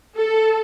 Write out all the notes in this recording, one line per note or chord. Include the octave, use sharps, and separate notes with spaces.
A4